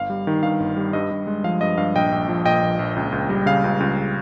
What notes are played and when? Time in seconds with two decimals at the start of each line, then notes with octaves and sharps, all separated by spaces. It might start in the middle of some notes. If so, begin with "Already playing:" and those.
Already playing: G1 F5
0.10 G3
0.27 D#3
0.43 G2 F5
0.60 G1
0.77 G3
0.93 G2 D#5
1.11 G2
1.27 G#3
1.44 F3 F5
1.61 G2 D#5
1.78 G2 F5
1.96 A#1 D#5 G5
2.12 A#1
2.29 F3
2.45 A#2 D#5 G5
2.63 A#1
2.79 A#1
2.96 C#2
3.12 C#2
3.29 G3
3.46 C#3 F5
3.64 C#2
3.80 C#2